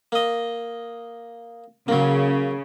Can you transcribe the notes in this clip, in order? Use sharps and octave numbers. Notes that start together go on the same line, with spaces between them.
A#3 D#5
C#3 F#3 A#3